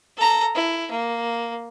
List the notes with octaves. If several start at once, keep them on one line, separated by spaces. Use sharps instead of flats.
A4 A#5
E4
A#3